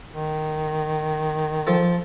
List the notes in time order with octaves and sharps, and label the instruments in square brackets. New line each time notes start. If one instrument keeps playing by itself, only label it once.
[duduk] D#3
[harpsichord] F3 A4